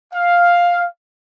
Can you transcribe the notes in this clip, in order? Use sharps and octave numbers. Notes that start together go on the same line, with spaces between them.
F5